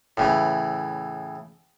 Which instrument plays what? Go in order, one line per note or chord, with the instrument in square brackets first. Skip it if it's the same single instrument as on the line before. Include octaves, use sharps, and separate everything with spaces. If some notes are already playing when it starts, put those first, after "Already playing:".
[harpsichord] A2 C#3 E3